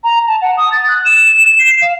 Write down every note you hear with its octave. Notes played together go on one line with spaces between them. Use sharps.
A#5
A5
F#5
D#6
A6
F#6
E7
E7
C7
F5